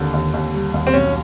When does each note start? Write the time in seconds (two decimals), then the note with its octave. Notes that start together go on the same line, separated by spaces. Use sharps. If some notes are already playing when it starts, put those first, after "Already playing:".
Already playing: D#2 D3
0.13 D#2
0.34 D#2
0.54 G3
0.74 D#2
0.87 C4
0.93 B1 C#4